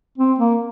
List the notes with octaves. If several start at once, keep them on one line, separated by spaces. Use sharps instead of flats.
C4
A#3